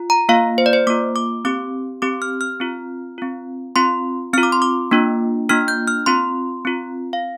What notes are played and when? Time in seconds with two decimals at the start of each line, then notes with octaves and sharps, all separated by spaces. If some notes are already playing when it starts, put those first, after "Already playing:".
Already playing: F4
0.10 A#5
0.29 A#3 F4 F5
0.58 C5
0.66 D5
0.73 C5
0.87 A#3 F4 D6
1.16 D6
1.45 C4 G4 D6
2.02 C4 G4 D6
2.22 F6
2.41 F6
2.60 C4 F4
3.18 C4 F4
3.76 C4 F4 C6
4.33 C4 F4 F6
4.43 D6
4.52 C6
4.62 D6
4.91 A#3 D4 F4
5.49 A#3 D4 F4 F6
5.68 G6
5.87 F6
6.06 C4 F4 C6
6.65 C4 F4
7.13 F5